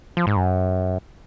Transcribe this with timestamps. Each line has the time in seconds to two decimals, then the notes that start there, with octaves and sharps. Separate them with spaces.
0.17 F3
0.27 G#2
0.36 F#2